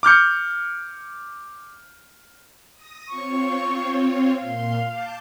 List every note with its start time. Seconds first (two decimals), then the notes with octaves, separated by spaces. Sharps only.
0.03 D6 F6 G6 C#7
2.72 D#6 A#6
3.08 C4 F4 C#5 C#6
4.36 A#2 F5 C6
4.86 A5 D6 G6